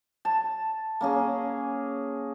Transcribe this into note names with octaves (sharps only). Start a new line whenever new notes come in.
A5
A#3 C#4 G#4